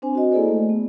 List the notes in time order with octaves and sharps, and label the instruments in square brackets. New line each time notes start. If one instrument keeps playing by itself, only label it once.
[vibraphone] C4 D4 C5 G#5
F#4 D#5
A#3 E4 G#4 A4 C5 D5
A3
B3